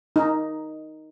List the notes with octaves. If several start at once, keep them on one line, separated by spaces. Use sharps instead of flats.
D#4